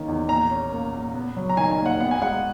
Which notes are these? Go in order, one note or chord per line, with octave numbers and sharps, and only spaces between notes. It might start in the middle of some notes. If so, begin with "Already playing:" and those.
Already playing: D#3 A#3 C#4
E2
A#2 A#5
C#4
A#3
A#2
B3
F#3
A#5
D#3 G#5
G#5
D#2
F#5
B3 F#5
G#5
G#3 F#5